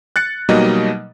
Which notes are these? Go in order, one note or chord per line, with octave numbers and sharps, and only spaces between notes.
F#6 A6 C#7
B2 F#3 G3 A#3 D#4 D#5